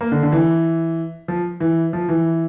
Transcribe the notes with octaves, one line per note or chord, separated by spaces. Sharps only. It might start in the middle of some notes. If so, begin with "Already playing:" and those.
A#3
D3
D3
E3
F3
E3
F3
E3